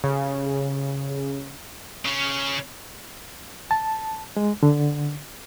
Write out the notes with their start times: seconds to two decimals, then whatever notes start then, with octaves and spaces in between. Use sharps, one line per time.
0.04 C#3
2.05 C#3 C#4
3.71 A5
4.37 G#3
4.63 D3